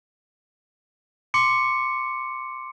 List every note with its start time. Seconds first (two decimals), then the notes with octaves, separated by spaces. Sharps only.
1.34 C6 D6 C#7